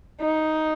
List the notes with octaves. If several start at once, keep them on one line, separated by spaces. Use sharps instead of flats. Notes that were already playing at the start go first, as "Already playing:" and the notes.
D#4